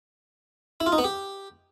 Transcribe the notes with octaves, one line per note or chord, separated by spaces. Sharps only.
E4
F4
D#4
B3
G4